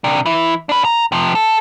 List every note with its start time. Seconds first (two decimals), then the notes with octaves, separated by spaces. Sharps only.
0.04 C3 D4
0.26 E3 E4
0.69 D4 B4
0.85 A#5
1.12 C3 F3
1.35 A4